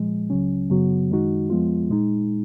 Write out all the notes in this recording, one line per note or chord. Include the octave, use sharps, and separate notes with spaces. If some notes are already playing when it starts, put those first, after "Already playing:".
Already playing: A#2 F3 G#3
C#2 C#3 F#3 C#4
F#2 C#3 F#3 B3 F#4
F#2 D#3 G#3 D#4 F#4
F2 F3 G#3 B3 F4
A#2 G#3 D#4